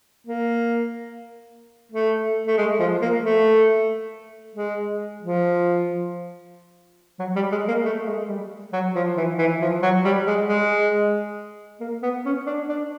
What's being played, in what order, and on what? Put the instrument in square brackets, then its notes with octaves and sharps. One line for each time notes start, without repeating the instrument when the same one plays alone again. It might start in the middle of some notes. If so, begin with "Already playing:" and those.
[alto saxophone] A#3
A3
A3
G#3
F3
A#3
A3
G#3
F3
F#3
G3
G#3
A#3
A3
G#3
G3
F#3
F3
E3
E3
F3
F#3
G3
G#3
G#3
A#3
B3
C#4
D4
D4